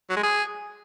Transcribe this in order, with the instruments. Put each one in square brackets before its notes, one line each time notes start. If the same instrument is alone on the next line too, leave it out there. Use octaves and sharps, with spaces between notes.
[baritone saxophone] F#3
G#3
G#4